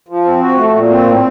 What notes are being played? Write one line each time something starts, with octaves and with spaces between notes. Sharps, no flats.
F3
C4
F#4
A3
A#2
C4
A2